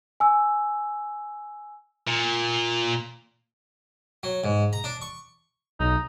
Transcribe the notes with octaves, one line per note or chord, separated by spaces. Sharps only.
G#5 E6
A#2
F#3
G#2
A#5
D4
C#6
B1 D#4